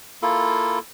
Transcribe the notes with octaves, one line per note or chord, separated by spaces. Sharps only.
A#3 E4 F4 A4